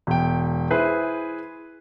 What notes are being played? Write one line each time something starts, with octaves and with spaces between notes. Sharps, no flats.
E1 G5
E4 G#4 B4 C5